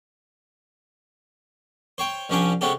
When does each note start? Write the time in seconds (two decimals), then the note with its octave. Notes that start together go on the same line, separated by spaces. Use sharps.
1.98 C5 C#5 G5
2.29 C2 F3 C#4 D4 G5 G#5
2.61 C3 G#3 C#4 F#4 G4 A4